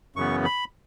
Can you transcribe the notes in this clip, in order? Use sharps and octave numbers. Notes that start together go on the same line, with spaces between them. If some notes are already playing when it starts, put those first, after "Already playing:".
F#2 C#3 E3 B3 C#6
B5